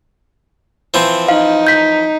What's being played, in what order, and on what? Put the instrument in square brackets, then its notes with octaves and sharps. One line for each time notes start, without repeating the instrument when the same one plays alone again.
[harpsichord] E3 F3 C4
[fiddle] D#4 [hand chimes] F5
[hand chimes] G6 B6